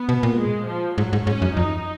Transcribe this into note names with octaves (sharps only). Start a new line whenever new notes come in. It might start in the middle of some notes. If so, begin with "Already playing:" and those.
Already playing: B3
B2
A#2
G#3
F3
G#2 F#3
G#2
G#2 C#4
F#2
F2 D#4